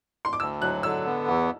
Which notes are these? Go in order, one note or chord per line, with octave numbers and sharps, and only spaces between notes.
C6
D6
D2 E6
F#3 F#6
D3 E6
B3
E2